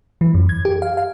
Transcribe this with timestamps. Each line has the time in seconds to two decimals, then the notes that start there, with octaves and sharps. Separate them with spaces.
0.21 E3
0.34 F#2
0.49 G#6
0.65 G4
0.82 F5
0.97 F5